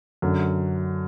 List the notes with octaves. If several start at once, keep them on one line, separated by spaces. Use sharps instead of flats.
F#2 D3